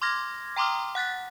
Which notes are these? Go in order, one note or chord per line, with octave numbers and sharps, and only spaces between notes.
C6 D6 F6 G#6 A#6
G5 A#5 C6 D6 D#6 F6
F#5 F#6 A6 B6